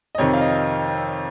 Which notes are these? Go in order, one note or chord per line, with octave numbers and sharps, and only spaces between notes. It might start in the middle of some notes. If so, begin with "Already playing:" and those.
D#5
F2 C3 D#3 C#5
F5
D#5